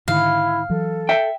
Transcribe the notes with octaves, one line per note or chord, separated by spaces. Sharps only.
G#2 D3 D#3 E4 F5
E3 F#3 A4
E5 G5